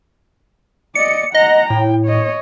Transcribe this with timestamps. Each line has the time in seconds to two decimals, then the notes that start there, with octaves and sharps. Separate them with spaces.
0.95 D5 D#5 C#7
1.34 D#5 F#5 A#5
1.70 A2 G5
2.06 C#5 D#5